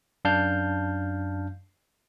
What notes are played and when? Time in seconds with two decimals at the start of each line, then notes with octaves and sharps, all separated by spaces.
0.25 F#2 D4 F5 A5 F6 G6